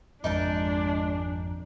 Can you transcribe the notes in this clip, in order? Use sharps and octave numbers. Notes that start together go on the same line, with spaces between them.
G#1 F2 A#2 G#3 D4 D#4 A#4 A5